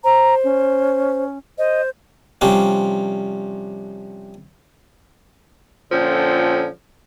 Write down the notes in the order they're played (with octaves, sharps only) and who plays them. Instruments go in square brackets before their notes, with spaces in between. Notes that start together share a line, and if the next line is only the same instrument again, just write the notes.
[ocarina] C5 [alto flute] A#5
[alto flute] C#4
[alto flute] C5 [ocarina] D#5
[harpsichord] C3 F3 G3 C#4 D4
[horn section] A#2 D3 F3 C#4 A4 G5